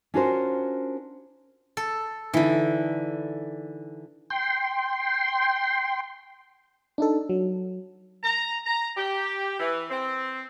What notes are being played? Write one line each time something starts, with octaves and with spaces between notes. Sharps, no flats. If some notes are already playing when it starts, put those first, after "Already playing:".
C#4 D4 F4 F#4 A#4 C5
A4
D3 E3 D#4 E4
G5 C6
D4 D#4 A4
F#3
A#5
A#5
G4
E3
C4